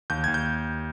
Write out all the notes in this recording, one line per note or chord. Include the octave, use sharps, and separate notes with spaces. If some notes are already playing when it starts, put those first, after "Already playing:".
D#2 G6
D#2 G#6
G6